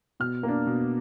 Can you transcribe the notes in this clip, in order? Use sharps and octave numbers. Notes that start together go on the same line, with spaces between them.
B2 F6
A#3 D4
B2